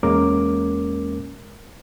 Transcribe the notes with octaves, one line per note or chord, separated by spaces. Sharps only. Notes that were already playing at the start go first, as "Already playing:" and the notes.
E2 G#3 A#3 C#4 A#4 D6